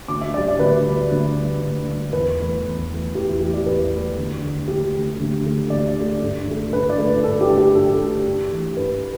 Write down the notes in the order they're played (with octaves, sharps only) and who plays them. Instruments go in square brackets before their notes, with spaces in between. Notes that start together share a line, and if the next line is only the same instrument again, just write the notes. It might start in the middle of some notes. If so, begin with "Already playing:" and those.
[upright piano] D2 D6
E5
D3 G3 D5
D5
D2 B4
D3 G3
D2
D3 G3
D2
D3 G3
E2 B4
E3 A3
E2
E3 A3
E2 G4
E4
E3 A3 G4
D5
E2 B4
E3 A3
D2
D3 A3
D2 G4
D3 A3
D2
D3 A3
D2 D5
D3 A3
G2
D3 A3
G2 B4
D5
D3 A3
B4
G2 A4
G4
D3 A3
G4
G2 A4
D3 A3
G2
E3 A3
G2 B4